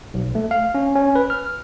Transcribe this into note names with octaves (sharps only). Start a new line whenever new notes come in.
B1
A3
F5
C#4
C#4
B4
F6